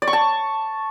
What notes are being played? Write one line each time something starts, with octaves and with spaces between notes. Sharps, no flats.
D5
C#6
A5